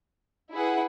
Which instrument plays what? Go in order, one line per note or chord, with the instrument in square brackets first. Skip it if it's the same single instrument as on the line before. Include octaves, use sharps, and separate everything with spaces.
[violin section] E4 G#4 B4 F#5